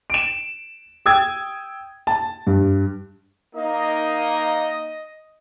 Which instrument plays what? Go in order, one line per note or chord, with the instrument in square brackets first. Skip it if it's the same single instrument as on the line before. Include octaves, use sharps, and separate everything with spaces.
[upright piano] D7 E7
G5 D#6 E6 G#6
A5
G2
[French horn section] A#3 D#4 [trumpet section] D#5